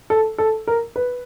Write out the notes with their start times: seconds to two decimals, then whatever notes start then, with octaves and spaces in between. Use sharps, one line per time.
0.10 A4
0.38 A4
0.67 A#4
0.96 B4